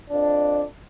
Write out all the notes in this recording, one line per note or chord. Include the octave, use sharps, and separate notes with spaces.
F2 D4